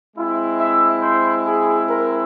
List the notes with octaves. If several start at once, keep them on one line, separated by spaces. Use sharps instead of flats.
G#3 C4 E4
E5
C5
G#4
A#4